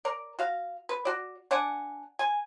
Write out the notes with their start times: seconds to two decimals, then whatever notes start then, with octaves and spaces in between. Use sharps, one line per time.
0.05 A#4 D5
0.39 F#4 F5
0.89 B4
1.05 F#4 D5
1.51 D4 D5 F#5 G#5
2.19 G#5